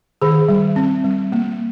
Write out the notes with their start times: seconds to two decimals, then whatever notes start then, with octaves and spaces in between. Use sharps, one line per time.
0.22 D#3 G#4
0.49 G3
0.76 C4
1.04 G3
1.32 A#3